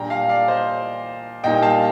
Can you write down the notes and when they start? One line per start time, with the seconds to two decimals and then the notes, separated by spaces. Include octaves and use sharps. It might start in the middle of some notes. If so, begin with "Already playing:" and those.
Already playing: A#2 G3 D4 G5 A#5
0.10 F5 A5
0.29 D5 F5
0.48 C5 D#5
1.44 A#2 G3 A#3 D#4 D#5 G5
1.62 F5 A5